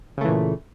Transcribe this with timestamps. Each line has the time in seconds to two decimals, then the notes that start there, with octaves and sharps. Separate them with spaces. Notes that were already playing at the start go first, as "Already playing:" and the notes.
0.17 C#3
0.21 A3
0.25 E3
0.28 A#2